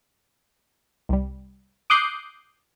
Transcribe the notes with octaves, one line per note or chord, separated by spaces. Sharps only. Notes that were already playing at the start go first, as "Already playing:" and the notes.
C2 G3
D6 D#6 F#6 G6 C7